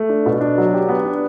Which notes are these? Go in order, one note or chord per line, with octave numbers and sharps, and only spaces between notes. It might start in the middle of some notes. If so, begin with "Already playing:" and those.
Already playing: A3
D4
B2
D4
F#3
G4
B3
D4